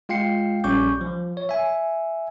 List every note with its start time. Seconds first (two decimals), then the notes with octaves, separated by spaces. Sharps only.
0.09 G#3 F4 F5 G5 C7 C#7
0.64 A#1 G3 C#4 C#6 D6 G6
1.01 F3
1.37 C#5
1.49 E5 G#5